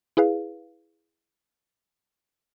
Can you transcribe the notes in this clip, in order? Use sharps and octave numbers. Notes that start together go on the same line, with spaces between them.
E4 G#4 B4 F5